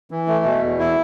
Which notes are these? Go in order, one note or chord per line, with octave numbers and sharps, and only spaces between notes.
E3
A3
B2
E2
E4